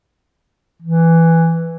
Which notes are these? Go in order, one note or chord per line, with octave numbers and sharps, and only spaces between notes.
E3